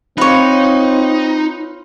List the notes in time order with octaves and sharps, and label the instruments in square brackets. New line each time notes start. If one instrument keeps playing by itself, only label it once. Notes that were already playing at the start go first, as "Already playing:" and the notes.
[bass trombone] C4 [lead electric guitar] D#4 [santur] F4 [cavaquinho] B4 C#5